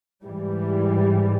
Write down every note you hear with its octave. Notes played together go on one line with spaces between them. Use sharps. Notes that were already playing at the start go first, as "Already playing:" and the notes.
G#2 E3 G3